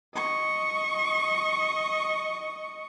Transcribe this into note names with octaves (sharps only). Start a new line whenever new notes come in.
D#5 C#6